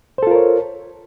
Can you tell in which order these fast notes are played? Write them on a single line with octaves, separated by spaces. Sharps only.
C5 A4 F4 A#4 C#5